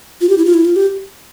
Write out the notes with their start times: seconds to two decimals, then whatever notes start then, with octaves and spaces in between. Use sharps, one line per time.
0.21 F4
0.29 G4
0.38 E4
0.45 F4
0.54 E4
0.65 F4
0.76 G4